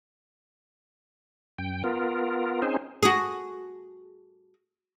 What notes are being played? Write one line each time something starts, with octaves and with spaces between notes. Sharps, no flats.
F#2 G5
B3 F4 A#4
C4 C#4 D#4 G#4 C5
F#4 G#4